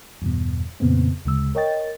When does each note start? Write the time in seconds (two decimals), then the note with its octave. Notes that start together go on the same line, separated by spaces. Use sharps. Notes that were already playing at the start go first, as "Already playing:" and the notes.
0.22 E2 G2 B2
0.80 F2 A#2 C#3 B3 C4
1.25 D2 C#3 G#3 E6
1.55 A#4 C#5 D#5 G5 A6